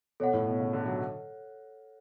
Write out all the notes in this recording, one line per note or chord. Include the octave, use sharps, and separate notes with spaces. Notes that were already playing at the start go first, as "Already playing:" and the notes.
B2 A4 C#5 F#5
A2
B2
C#3
D3
F#3